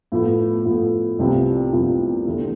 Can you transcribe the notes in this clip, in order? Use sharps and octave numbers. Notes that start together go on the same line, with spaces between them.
A2 F3 B3
A2 F3 B3
C2 C3 F3 B3
C2 C3 F3 B3
E2 D3 A3 E4